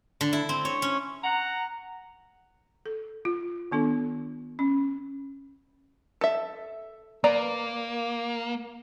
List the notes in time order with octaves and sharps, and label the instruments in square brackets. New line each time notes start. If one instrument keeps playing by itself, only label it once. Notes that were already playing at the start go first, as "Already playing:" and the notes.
[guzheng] D3
E4
C4
C#5
C#4
[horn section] F#5 A#5
[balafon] A4
F4
D#3 B3 D4 A4
C#4
[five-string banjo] A4 E5
[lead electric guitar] A#3 [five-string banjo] B4 D5 A#5